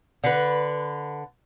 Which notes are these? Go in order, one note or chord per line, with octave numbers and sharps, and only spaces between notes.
D3 B4